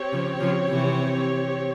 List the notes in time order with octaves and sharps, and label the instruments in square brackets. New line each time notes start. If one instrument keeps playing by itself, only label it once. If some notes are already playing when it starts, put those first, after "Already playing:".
Already playing: [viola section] C4 G4 C#5
[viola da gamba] C#3 F3
C#3 F3
C3 E3